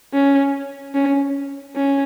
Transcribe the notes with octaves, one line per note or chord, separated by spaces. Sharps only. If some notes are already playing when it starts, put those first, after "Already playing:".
C#4
C#4
C#4